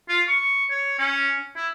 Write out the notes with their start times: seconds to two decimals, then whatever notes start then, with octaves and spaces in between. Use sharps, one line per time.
0.09 F4
0.28 C#6
0.71 C#5
0.99 C#4
1.56 E4